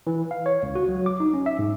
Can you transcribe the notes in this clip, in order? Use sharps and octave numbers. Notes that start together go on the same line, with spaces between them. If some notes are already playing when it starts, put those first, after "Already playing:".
E3
F5
C#5
C#2
F#4
F#3
D6
D#4
C#4
E5
G#2